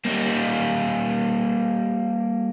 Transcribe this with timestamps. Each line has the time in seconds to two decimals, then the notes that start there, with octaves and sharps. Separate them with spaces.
0.05 G3 A#3